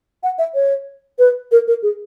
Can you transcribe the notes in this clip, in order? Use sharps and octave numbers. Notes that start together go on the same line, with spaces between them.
F#5
E5
C#5
B4
A#4
A#4
G#4